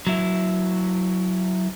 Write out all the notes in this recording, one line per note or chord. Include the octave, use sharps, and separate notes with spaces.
F#3 E4